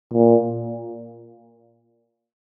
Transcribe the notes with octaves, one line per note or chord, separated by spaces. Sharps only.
A#2